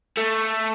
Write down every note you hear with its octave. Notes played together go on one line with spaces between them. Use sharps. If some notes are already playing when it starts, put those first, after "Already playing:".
A3